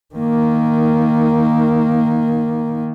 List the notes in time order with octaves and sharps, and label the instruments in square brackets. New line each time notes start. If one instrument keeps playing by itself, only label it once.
[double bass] D#3 A#3